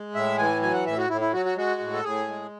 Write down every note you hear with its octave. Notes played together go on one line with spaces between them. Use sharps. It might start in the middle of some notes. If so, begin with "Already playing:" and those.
Already playing: G#3
A2 E5
E3 G#5
F#3 G#5
F#5
A2 E5
F#4
A2 E4
E4
F#3 F#4
F#4
G#3 F#4
A2
A4
A2 G#4
G#3